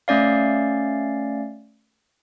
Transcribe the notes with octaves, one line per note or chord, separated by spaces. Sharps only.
A3 C#4 D5 F5